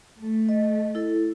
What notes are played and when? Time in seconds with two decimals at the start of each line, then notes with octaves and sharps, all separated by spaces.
0.19 A3
0.49 D#5
0.95 E4 A4